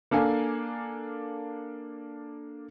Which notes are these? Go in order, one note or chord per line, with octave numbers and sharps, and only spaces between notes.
A#3 D4 A4 F5 G#5